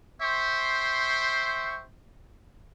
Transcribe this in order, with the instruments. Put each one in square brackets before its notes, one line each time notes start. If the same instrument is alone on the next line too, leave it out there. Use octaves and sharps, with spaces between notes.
[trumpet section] C5 E5 G5 C6 C#6